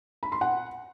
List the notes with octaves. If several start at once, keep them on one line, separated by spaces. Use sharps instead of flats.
B5
C6
F#5